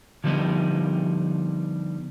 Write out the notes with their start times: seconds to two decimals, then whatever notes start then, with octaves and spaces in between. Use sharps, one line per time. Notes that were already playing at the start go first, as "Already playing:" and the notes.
0.24 D3 F3 G3 B3 D#4